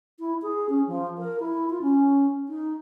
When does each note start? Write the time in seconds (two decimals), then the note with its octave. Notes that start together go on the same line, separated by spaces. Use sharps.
0.19 E4
0.42 G#4
0.69 C#4
0.87 F3
1.18 A#4
1.40 E4
1.70 F4
1.82 C#4
2.49 D#4